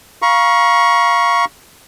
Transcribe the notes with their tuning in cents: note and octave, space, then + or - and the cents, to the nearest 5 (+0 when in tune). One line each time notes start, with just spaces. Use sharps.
F5 +0 A#5 +40 C#6 +0